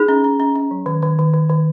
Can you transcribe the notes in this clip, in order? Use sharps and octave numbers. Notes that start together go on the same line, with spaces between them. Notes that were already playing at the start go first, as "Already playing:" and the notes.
Already playing: D#4 G#4
C#4
C#4
C#4
C#4
F#3
D#3
D#3
D#3
D#3
D#3